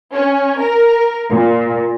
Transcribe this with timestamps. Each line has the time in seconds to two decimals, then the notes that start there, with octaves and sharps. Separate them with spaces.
0.14 C#4
0.60 A#4
1.30 A#2